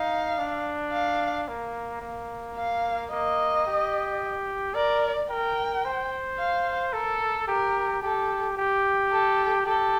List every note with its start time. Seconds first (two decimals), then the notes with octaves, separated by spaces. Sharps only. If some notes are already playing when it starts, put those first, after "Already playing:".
Already playing: D#4 F5
0.38 D4
0.93 F5
1.48 A#3
2.02 A#3
2.57 F5
3.11 A#3 D#5
3.67 G4
4.74 A#4 D5
5.30 A#4 G5
5.85 C5
6.38 F5
6.93 A4 A#4
7.47 G4 A#4
8.02 G4 A4
8.57 G4
9.11 A4
9.66 G4 A4